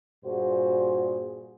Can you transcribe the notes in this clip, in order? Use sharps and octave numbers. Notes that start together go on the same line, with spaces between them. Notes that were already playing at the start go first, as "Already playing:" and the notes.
G2 A#2 F#4 G#4 C5